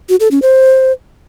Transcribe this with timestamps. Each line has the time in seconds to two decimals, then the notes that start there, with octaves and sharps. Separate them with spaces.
0.09 F#4
0.20 A4
0.31 C#4
0.42 C5